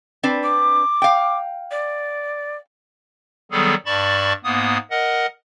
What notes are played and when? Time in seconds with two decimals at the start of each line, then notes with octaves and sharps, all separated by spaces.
0.23 C4 D4 B4
0.43 D6
1.02 F5 G5
1.71 D5
3.51 D#3 F#3 G3 B3 G#4 A4
3.86 G2 D5 A5 B5 C#6 A6
4.44 G#2 A#3 B3 D#6
4.91 A#4 D#5 F#5